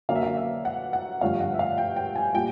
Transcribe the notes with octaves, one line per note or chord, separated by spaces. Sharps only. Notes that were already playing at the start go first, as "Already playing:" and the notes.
D3 F#3 A#3 C#4 F5
E5
F5
E5
F#5
F#5
G2 D3 F3 A3 C#4 F5
F#5
E5
F5
G5
G5
G#5
A#2 G3 G5